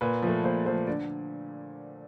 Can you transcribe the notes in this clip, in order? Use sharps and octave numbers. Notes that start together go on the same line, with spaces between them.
A#2 B4
F3 A3
A#2 C5
F3 A3 C5
D3 D5